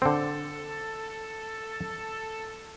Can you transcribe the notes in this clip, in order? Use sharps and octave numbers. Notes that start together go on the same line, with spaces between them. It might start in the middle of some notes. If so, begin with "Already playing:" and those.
D3 C4 A4